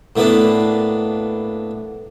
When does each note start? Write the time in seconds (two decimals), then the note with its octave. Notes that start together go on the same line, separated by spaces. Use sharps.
0.16 A2 A#3 B3 D4